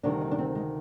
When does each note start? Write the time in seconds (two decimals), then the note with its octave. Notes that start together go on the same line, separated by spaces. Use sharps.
0.03 D2 C3 D#3 G3 D4
0.21 D#4
0.31 D4
0.38 C4
0.55 G#3